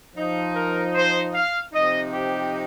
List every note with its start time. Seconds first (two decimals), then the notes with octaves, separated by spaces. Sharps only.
0.15 F3 D#4
0.54 A#4
0.94 C5
1.33 F5
1.72 C3 F3 C4 D#4 D#5
2.11 G4